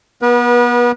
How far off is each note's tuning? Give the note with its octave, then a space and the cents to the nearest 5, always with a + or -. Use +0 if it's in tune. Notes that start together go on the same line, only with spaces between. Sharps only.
B3 -25 B4 -40